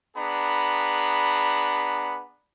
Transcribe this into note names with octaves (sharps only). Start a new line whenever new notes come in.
B3 D4 G#4 A#5 B5